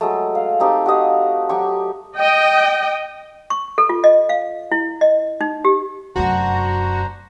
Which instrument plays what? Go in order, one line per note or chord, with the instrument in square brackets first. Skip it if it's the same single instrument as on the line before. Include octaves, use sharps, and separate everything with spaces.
[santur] F#3 G#3 A3
F5
C4 D#4 G4 A5
F#4 G4 D#5 F5
F#3 G4 C#6
[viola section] D#5 G5
[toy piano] C#6
A4
F4
D#5
F5
E4
D#5
D#4
G4
[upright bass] F1 F#2 [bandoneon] D4 C5 A#5 [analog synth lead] F#4